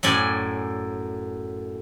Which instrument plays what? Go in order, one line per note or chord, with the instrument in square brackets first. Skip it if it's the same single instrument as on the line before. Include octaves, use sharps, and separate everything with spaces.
[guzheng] F#2 A2 D5 G#5